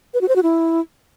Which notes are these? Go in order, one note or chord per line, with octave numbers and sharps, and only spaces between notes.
B4
F#4
C5
F#4
E4